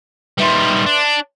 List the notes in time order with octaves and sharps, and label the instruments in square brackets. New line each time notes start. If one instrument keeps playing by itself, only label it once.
[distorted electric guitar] D#3 G3 [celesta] B4 E5 C6
[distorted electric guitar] D4